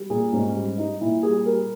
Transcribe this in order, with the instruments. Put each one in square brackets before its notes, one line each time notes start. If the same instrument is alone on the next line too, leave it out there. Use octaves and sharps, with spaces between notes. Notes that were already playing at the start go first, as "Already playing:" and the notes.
Already playing: [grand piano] G3
A#2 G#4
G#2 C#4
G3
G3 D#4
A#2 E4
G3 G#4
G3 A#4